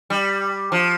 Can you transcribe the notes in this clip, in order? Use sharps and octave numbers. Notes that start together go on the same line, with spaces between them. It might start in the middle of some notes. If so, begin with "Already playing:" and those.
G3
F3